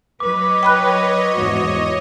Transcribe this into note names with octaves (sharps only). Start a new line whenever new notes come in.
F#3 B4 C#5 D#5 D6
G5 B5 F#6
E2 G#2 F#4